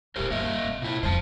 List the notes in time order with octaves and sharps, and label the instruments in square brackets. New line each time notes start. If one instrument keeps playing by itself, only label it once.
[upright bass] D2 A#2 [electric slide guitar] G4 A#4 C5
[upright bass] G1 E3 [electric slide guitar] A#3 D#5 E5
[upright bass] C3
[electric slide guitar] A#2 E4
[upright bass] F2 D3 [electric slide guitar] C5 A5